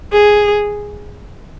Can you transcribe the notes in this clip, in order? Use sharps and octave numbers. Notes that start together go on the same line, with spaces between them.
G#4